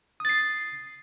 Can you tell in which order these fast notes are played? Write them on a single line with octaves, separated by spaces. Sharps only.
D#6 A6 C7